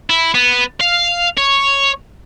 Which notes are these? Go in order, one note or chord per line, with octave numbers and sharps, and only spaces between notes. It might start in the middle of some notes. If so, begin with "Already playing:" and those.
E4
B3
F5
C#5